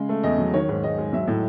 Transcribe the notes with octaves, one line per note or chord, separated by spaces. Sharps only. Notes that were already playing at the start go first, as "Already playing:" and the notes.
Already playing: C#3 G#3
A3
E2 D#5
F#3
D#3 C#5
G#2
G#2 D#5
G#3
F#3 E5
A2